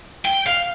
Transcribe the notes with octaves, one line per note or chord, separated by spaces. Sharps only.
G5
F5